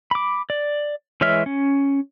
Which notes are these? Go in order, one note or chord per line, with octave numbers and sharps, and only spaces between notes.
B5 D6
D5
E3 G#3 C#5 E5 F6
C#4